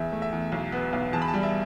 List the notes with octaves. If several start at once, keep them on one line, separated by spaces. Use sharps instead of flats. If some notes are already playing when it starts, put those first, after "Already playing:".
Already playing: E2 E5
A3
E5
E2
B1
B3
B1
E2 A5
B5
A5
G3
E5